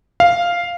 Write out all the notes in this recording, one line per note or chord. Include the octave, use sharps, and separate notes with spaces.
F5